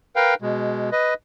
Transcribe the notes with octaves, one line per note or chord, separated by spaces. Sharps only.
A#4 B4 F5 G5
B2 G#3
B4 D#5